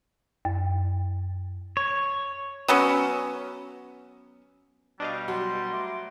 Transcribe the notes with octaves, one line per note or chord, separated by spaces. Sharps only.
F#2
C#5
F#3 B3 C#4
B2 G3 D4 D#5 F5 C#6
F#3 F#4 C6
A3 D6